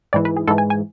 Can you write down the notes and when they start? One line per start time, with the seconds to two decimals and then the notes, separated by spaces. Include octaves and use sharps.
0.13 G#2 E3 D5
0.25 B4
0.36 G#4
0.47 G#2 E3 A4
0.58 G#5
0.70 G#5